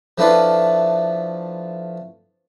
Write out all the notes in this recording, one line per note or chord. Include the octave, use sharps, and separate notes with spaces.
F3 A3 D4 E4 F4 B4